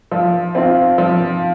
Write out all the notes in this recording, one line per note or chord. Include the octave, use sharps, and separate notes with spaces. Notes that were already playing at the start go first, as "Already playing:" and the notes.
F3
C4 F4
F3